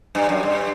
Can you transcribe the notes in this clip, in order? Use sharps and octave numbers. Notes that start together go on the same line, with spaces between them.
G2
F#2
G2